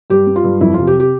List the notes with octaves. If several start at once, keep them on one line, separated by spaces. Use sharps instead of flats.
G2 G4
G3
F4
G2
F2 E4
C3 F4
G4
G4